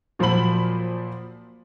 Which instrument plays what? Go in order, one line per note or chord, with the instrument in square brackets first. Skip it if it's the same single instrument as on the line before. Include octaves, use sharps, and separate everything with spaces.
[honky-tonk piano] A#2 F3 F#3 C5 B5 F#7